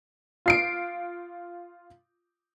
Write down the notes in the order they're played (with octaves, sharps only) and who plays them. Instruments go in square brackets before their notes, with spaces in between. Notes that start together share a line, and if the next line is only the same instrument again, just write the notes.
[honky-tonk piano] F4 C7 D7